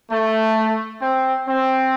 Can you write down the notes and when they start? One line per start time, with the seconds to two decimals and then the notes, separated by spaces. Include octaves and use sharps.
0.11 A3
1.01 C4
1.47 C4